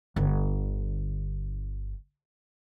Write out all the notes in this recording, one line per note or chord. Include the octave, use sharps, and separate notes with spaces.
G1 D3